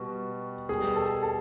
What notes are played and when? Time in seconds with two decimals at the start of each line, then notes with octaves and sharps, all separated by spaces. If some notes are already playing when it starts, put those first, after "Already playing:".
Already playing: B2 G3 F#4
0.69 B2 G3 G#4
0.96 A4
1.23 A4